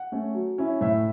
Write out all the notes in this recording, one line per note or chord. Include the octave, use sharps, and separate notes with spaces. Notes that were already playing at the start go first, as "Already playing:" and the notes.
Already playing: F#5
A3 C#4
F#3
C#4 E4
A2 E5